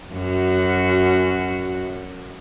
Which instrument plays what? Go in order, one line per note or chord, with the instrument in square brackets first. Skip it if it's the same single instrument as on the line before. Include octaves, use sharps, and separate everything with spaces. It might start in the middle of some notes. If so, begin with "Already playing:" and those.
[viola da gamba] F#2 F#4